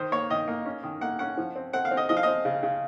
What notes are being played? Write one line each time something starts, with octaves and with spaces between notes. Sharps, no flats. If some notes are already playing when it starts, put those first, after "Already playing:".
Already playing: D#3 C5
A#3 C#5
D#3 D#5
A#3
C#4
D#3
A#3 F#5
C#4 F#5
F3
C4
C4 F#5
F5
C4
D#5
F3 D#5
F5
C4 D#5
C#3
C#3